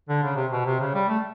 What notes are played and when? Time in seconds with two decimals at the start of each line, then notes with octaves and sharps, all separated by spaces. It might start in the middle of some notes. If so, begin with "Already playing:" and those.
0.09 D3
0.23 C#3
0.36 C3
0.52 B2
0.65 C3
0.80 C#3
0.94 G3
1.08 A3